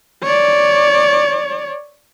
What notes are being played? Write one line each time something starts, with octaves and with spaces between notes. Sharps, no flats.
C#5 D5